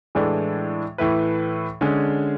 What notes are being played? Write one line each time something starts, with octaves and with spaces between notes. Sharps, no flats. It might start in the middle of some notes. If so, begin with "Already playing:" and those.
A2 E3 G#3 D4 A4
A2 E3 A3 E4 B4
D3 G#3 C#4 G#4